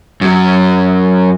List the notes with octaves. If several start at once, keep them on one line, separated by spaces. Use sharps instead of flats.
F#2 F#3